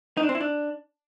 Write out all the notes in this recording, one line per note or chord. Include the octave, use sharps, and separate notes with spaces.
D#4
D4
C4
E4
D4